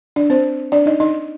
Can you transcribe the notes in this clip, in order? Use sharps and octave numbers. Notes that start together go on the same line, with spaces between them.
D4 D5
C4 C5
D4 D5
D#4 D#5
D#4 D#5